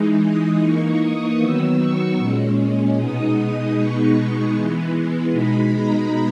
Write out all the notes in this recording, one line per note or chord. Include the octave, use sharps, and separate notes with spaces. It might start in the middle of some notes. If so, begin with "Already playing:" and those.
Already playing: E3 G#3 D#4
D#6
E3 A#3 D#4 C#6
D#6
D#3 F#3 B3 E6
C#6
A#2 G#3 C#4
B2 G#3 B3 D#4 D#6
D#6
B2 G#3 B3 D#4 C#6
E3 G#3 B3
B2 G#3 D#4 B5
A#5